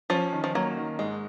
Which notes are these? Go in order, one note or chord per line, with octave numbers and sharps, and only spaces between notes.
F3 C#4
D#3
F3
F#3 A#3
D#3
G#2 G#3